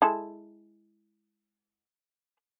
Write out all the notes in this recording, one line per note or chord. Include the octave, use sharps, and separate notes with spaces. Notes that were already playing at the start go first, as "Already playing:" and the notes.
G#3 E4 A4